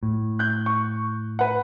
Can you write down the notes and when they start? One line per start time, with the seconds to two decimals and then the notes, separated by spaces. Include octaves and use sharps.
0.03 A2
0.39 F#6 G6
0.66 C#6
1.39 B4 F#5